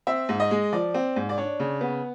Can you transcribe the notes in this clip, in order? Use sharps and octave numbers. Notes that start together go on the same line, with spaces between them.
C4 E5
G#2
D#5
G#3
F3 D5
C4
G#2
D5
D4 C#5
C#3
B3